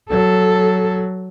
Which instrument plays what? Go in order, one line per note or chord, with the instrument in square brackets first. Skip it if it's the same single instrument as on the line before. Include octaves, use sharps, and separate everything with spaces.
[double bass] F#3 [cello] A4